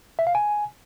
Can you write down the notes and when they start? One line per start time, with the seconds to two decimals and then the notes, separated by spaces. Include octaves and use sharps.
0.19 E5
0.27 F5
0.35 G#5